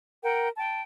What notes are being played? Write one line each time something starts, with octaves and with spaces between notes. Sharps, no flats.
A#4 F#5 G5
G5 A5